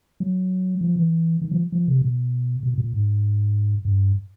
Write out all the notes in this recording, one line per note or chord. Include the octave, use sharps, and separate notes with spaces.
F#3
F3
E3
D#3
F3
F3
C3
B2
B2
A2
A#2
G#2
G2